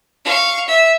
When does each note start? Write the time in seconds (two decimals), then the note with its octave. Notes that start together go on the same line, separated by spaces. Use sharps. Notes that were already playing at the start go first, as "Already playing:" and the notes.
0.25 F5 C#6
0.68 E5